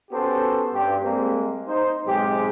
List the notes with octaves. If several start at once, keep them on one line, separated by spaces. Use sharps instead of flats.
B3 C#4 F#4 G4 A4 C5
G2 G4
G3 G#3 A#3 C4
D#4 C5
B1 G#2 G#3 C4 G4